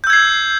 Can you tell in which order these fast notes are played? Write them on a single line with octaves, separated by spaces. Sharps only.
G6 E6 G#6 C7